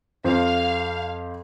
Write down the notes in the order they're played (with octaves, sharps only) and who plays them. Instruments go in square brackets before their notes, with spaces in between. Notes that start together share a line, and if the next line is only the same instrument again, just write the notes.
[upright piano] F2 C5 [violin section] F5